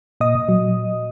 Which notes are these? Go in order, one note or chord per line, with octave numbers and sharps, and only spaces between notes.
A#2 D#5 D#6
A#2
F#3